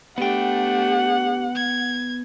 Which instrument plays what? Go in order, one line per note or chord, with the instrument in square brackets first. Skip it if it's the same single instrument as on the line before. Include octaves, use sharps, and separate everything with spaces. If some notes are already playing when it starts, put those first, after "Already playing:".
[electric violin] A3 D4 [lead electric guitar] B3 G5 [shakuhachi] G4 [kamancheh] F#5
[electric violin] G#6